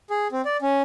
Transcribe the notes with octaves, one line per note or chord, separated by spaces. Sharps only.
G#4
C4
D5
C#4